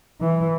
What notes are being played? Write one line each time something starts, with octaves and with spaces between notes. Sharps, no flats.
E3